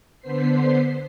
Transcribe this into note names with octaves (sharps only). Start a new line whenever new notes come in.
D3 B3 C5 B6 C7